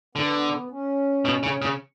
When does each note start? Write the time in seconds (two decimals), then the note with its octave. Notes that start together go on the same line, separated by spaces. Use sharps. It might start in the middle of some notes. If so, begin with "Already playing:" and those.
0.15 D3 B3
0.70 C#4
1.25 B2
1.43 C#3
1.62 C#3